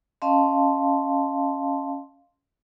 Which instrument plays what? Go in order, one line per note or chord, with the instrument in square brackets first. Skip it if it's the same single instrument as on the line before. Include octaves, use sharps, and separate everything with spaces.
[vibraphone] C#4 D#5 F5 A5 C6